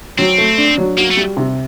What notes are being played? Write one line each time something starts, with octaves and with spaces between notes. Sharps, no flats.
F#3 C4
A3
D4
F#3
A#3 F#4
A3
G3
C3